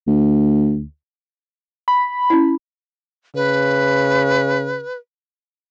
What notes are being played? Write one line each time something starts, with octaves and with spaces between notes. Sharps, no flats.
D2
B5
C#4 E4
C#3 B4